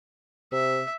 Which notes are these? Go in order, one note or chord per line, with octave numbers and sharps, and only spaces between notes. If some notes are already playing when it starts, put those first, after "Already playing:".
C3 E5